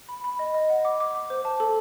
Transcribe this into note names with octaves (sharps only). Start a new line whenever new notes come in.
B5
B5
D#5
D#5
F#5
D6
D6
D6
C5
A5
A4